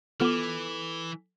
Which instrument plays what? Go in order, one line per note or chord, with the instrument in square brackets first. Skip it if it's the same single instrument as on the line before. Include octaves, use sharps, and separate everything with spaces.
[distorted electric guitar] E3 [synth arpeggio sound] B3 F4 F6 [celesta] A4 D6